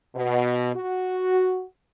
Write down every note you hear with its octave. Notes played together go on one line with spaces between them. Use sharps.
B2
F#4